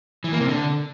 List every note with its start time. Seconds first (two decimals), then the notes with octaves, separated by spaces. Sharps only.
0.24 E3
0.32 A#3
0.40 C3
0.48 D3